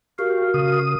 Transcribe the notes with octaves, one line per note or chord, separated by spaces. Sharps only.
F#4 G4 A#4 F5
C#3 D#6